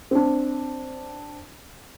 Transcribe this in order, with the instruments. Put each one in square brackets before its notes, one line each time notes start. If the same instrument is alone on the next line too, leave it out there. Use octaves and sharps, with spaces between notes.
[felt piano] C4 D4